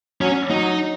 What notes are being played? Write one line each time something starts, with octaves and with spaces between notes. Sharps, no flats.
F#3 C#4
F#3 D#4